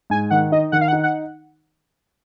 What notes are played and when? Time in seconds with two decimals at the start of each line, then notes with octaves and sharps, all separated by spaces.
0.10 G#2 G#5
0.30 D#3 F#5
0.52 D#4 D#5
0.72 D#3 F#5
0.81 F5
0.88 F#5
0.92 D#4
1.03 F#5